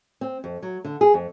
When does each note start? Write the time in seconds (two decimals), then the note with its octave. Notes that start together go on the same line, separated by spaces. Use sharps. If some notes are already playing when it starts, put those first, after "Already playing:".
0.21 C4
0.44 F2
0.62 F#3
0.85 D3
1.01 G#4
1.14 F2